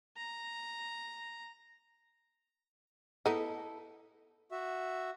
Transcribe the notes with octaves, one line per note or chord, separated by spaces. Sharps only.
A#5
B3 D#4 E4 A4
F#4 E5